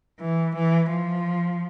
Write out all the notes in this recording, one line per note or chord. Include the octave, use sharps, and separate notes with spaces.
E3
E3
F3